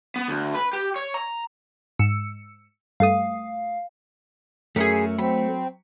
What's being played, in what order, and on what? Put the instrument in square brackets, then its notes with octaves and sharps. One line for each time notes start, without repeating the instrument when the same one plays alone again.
[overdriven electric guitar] B3
D2
B4
G4
C#5
A#5
[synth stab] G#2 E6 C#7
[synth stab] G2 A3 D#6 [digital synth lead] F5
[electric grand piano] F#2 A#4 C#7 [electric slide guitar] A3 [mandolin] G#4 B5
[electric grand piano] F#3 [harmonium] C4 [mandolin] B5